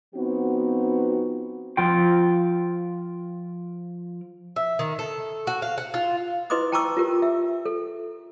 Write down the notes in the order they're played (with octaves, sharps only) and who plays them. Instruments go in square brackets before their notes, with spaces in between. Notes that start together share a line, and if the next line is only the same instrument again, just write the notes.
[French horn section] F3 B3 C4 D#4 F#4
[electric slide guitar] F3 F4 G5
[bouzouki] E5
D#3
A4
F#4
F5
F#5
F4
[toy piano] E4 B4 D#5 C6 D6 D#6
G5 A5 A#5 C#6 D6 E6
F4 G4 A#4
E5
A4